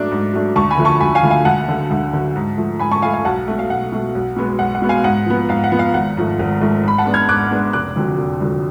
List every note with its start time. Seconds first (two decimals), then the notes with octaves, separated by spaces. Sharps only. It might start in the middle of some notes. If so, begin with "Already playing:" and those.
Already playing: G#2 F#3 A3 D4 D6
0.11 G#2
0.33 F#3 A3 D4
0.56 D2 A5 C#6
0.71 G#5 B5
0.78 D3 F3 A3
0.85 A5 C#6
1.00 D2 G#5 B5
1.15 F5 G#5
1.23 D3 F3 A3
1.31 F5 G#5
1.45 D2 F#5 A5
1.68 D3 F#3
1.91 D2
2.13 D3 F#3
2.36 G#2
2.58 F3 A3
2.79 G#2 G#5 B5
2.91 A5 C#6
3.02 F3 A3 F5 G#5
3.14 F5 G#5
3.24 B1 F#5 A5
3.48 B2 A3
3.59 F5
3.69 B1 F#5
3.92 B2 A3
4.15 B1
4.36 B2 G#3 B3
4.59 B1 F#5
4.75 F#5
4.82 B2 G#3 B3
4.89 F5 G#5
5.04 G#2 F#5
5.26 F3 B3
5.49 G#2 F5
5.64 F#5
5.72 F3 B3
5.79 F5
5.94 G#1 F#5
6.17 G#2 F3 A3
6.39 G#1
6.61 G#2 F3 A3
6.83 G#2 B5
6.98 F#5 A5
7.06 G#3 B3 D4
7.14 F6 G#6
7.29 G#2 D6 F#6
7.51 G#3 B3 D4
7.73 F1 D6 F#6
7.96 F2 D3 F#3
8.18 F1
8.41 F2 D3 F#3